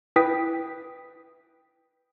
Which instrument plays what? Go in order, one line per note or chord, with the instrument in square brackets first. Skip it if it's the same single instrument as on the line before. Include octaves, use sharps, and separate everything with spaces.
[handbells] E4 B4 G5 D#6 B6